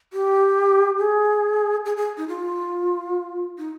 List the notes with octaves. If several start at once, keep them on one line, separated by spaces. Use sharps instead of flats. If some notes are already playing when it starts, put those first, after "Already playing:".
G4
G#4
G#4
G#4
D#4
F4
D#4